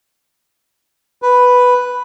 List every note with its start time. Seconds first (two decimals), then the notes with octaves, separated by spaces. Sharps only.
1.22 B4